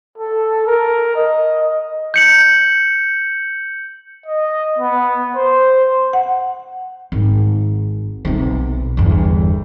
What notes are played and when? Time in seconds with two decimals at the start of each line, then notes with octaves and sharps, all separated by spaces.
0.18 A4
0.67 A#4
1.16 D#5
2.14 G6 C#7 F#7
4.26 D#5
4.79 B3
5.36 C5
6.13 F#5
7.12 G#1
8.25 B1 C3
8.97 G1 E2